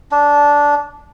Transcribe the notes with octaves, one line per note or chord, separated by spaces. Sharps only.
D4